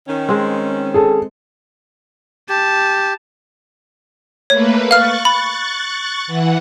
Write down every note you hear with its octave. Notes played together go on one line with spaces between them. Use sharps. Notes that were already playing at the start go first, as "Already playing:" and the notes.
D#3 C#4
G#3 C4
G#4 A4
G4 A5
A3 A#3 B4 C#5
F5 C#6 F6 F#6 A6
B5
E3 F#5